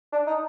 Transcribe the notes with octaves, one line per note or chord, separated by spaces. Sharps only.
D4
D#4